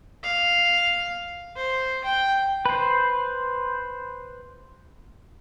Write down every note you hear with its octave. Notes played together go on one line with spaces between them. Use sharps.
F5
C5
G5
B4 C5